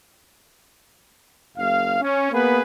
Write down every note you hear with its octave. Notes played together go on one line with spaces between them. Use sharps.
F#1 F5
C#4
A#3 B3 G#4 B4